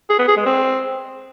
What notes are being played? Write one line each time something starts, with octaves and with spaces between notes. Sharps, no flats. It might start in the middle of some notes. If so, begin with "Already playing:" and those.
G#4
B3
G#4
G#3
C4